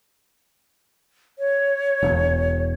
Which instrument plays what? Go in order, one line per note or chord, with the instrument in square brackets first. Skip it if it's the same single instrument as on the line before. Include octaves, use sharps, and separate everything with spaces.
[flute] C#5
[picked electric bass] E1